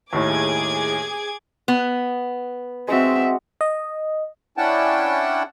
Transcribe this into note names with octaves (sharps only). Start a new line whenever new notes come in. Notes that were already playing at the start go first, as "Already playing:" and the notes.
D#2 A2 G#4 D6 G#6
B3
G#3 C4 F#4 E5
D#5
C#4 D4 E4 F#5 G5 A5